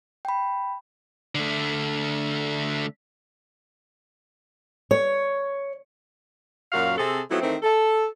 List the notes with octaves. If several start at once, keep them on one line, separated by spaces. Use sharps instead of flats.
G5 B5
D3 A3
C#5
F#2 A#2 F#3 F#4 F5
C3 C4 G#4 A4
F3 F#3 A3 B3 C4 E4
D#3 E3 A3 C4
A4